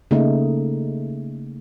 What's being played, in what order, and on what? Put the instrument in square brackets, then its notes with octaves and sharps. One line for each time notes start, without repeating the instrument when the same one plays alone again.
[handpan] C#3 A3 A#3 D#4